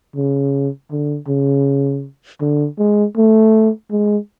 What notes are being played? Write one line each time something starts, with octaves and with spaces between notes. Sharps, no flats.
C#3
D3
C#3
D3
G#3
A3
G#3